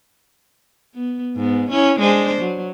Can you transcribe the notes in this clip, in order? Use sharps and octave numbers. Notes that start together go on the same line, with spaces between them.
B3
G#2 B3
C#4 E4
G#3 D4 C5
F#3